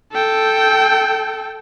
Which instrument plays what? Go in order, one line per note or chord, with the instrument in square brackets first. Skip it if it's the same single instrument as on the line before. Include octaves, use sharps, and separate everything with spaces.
[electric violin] A4 G5